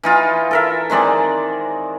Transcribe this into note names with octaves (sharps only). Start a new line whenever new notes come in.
E3 D#4 F4
A4 A#4 E5
D#3 G#3 C4 D5